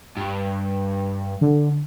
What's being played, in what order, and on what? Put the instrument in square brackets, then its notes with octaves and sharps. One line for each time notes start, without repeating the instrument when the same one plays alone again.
[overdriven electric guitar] G2
[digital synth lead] D3